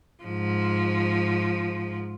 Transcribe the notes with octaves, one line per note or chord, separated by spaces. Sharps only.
G#2 F3